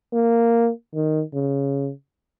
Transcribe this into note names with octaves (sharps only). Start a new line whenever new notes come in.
A#3
D#3
C#3